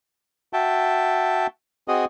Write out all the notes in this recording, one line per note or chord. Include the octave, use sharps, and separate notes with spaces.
F#4 E5 G5 A5
C4 F#4 G#4 D#5